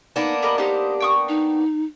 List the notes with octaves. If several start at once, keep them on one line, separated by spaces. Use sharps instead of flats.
A#3 B3 D4 D#4
G4 A#4 D#5 B5
D#4 G4 C5
G5 C#6 D#6
D#4